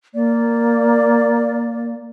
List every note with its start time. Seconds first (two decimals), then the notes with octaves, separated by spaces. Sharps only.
0.14 A#3 D5